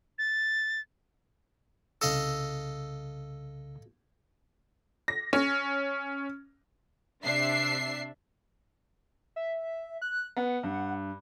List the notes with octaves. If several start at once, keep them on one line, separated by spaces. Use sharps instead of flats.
A6
C2 C#3 A4 D#5 F5 E6
A#6
C#4
C3 D4 E5 C7
E5
F#6
B3 F#5
G2